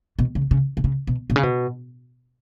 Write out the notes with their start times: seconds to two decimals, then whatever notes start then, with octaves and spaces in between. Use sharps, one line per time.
0.19 B2
0.35 C#3
0.51 C#3
0.77 B2
0.84 C#3
1.07 B2
1.30 B2
1.36 C#3
1.43 B2